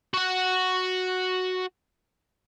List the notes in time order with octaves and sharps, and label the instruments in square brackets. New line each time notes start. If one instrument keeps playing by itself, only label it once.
[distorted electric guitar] F#4 F#5